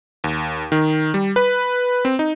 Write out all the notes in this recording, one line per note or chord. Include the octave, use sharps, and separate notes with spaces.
D#2
D#3
G3
B4
C4
D#4